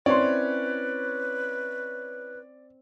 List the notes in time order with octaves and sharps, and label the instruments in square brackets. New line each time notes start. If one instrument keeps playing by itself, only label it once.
[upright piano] C4 C6 [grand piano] C#4 E4 C#5 [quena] B4 [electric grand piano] D5